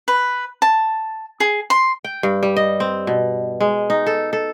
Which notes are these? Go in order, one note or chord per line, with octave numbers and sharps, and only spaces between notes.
B4
A5
G#4
C6
G5
G2
G3
D#5
C4
B2
G#3
D#4
A4
A4